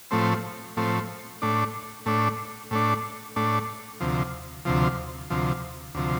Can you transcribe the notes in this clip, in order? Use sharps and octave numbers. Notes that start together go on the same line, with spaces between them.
A2 F3 A3 C4
A2 F3 A3 C4
A2 A3 D4
A2 A3 D4
A2 A3 D4
A2 A3 D4
D2 C3 F3
D2 C3 F3
D2 C3 F3
D2 C3 F3